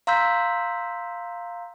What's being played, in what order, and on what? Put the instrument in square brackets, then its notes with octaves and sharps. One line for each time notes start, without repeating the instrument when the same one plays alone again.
[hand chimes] F5 A#5 C6 E6 G6 B6